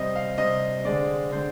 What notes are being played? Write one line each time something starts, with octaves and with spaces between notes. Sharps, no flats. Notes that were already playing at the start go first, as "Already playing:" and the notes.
Already playing: C3 G3 C4 D#5
F5
C3 G3 C4 D#5
D3 G#3 C4 D5
D3 G#3 C4 C5